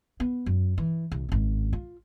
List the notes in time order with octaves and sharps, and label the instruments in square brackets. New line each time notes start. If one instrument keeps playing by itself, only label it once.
[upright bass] B3
F#2
E3
C2
G#1 C#4
F4